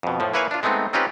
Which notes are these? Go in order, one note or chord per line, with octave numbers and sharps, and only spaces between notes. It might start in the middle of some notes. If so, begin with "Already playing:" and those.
F2 B2
A2 F3
A#3 E4 B4 C#5 F5 G#5
D4 F4
G#3 A3 B3 C4 D#4
C4 C#4 D#4 F4 G4 B4